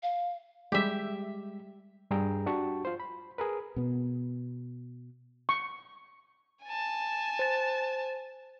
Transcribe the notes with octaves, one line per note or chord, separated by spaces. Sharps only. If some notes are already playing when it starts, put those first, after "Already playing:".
F5
G3 G#3 G4 E5
G2 G3 G#4 G5 A#5
D4 F#4 G4 A5 C#6
F4 C5
B5
G#4 A#4 B4
B2 B3
C#6
G#5 A5
C5 A6